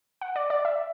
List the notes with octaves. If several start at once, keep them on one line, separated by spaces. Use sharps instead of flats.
F#5
D5
D5
E5